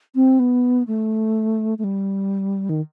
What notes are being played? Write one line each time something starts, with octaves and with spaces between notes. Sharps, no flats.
C4
B3
A3
A3
G3
D#3